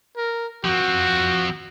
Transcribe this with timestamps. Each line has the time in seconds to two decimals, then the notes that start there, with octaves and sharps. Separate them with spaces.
0.16 A#4
0.65 F3 C4 F#4